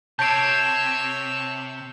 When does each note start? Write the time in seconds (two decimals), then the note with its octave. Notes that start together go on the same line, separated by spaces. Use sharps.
0.19 C3 C#5 A5 E6 G6 C7 D7